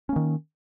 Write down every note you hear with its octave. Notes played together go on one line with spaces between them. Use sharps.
D#3 A#3 C#4